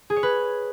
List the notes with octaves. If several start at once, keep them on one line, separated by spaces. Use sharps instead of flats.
G#4
C#5
B4